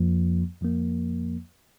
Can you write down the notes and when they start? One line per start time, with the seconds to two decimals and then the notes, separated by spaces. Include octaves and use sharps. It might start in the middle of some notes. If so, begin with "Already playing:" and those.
Already playing: F2 F3 A#3
0.61 F2 F3 A#3